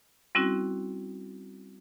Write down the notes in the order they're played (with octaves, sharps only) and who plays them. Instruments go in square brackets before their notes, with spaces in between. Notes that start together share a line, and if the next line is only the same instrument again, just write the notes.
[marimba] G3 C4 C#4 E4 F#4